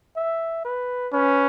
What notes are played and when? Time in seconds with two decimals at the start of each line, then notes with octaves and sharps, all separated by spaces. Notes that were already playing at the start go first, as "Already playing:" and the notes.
0.16 E5
0.65 B4
1.13 C#4 B4